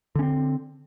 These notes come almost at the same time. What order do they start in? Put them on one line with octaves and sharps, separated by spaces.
D3 C#4 C4